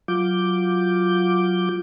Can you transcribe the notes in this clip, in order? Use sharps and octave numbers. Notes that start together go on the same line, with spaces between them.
F#3 F4 D6 G6